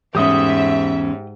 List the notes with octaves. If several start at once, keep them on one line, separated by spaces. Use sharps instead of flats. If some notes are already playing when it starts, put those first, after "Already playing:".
E2 G#2 C#4 G4 E5 D#6